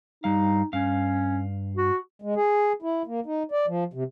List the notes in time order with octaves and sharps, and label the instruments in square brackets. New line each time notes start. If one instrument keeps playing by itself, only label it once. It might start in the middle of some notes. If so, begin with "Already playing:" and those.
[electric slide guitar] G2 G3 F5 [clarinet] D#4
[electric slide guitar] G2 F5 [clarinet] C#4
[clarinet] F#4
[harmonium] G#3
G#4
E4
A#3
D#4
D5
F3
C3